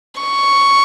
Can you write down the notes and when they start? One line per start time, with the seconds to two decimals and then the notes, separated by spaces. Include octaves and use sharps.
0.21 C#6